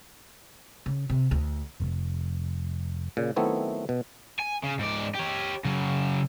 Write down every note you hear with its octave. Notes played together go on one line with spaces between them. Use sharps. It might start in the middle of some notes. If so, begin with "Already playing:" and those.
C#3
C3
D2
F1
A#2 C#3
D#3 F#3 A3 B3 C4 E4
B2
G#5
C#3
G#2 D5
G4 C#5
C#3 F#3